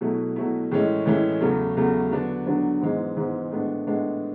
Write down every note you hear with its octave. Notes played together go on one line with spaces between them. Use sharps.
B2 F#3 A3 E4
B2 F#3 A3 E4
A2 E3 G#3 C#4 E4
A2 E3 G#3 C#4 E4
E2 C#3 F#3 A3
E2 C#3 F#3 A3
D3 F#3 B3 D4
D3 F#3 B3 D4
G#2 E3 G#3 B3
G#2 E3 G#3 B3
A2 G#3 B3 D4
A2 G#3 B3 D4